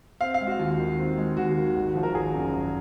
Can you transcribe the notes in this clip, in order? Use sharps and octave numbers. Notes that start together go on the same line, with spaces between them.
C4 F5
F5
G#3
F#4
D#2 F4
D#3
C4
G#3
D#2 F#4
D#3
G#1
F3
A#4
G#1 G#4
F#2
G#1